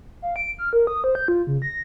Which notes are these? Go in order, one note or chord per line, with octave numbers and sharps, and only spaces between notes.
F5
D7
F6
A#4
D#6
C5
G6
F4
C#3
A#6